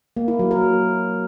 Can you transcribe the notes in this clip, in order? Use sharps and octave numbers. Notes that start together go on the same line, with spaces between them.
A#3
E4
F#3
A#4